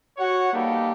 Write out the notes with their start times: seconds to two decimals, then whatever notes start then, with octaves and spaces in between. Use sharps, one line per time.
0.18 F#4 C#5 F#5
0.52 G3 A#3 B3 D#4 G4 A4